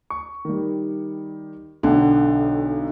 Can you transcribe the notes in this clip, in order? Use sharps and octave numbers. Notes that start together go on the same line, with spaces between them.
C#6
D#3 G3
B1 D3 F#5 G5